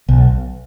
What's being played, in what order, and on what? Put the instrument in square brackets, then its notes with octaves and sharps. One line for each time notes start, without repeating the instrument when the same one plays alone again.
[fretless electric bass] B1